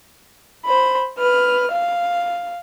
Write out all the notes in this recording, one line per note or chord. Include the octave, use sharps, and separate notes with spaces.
C5 B5
B4 F6
F5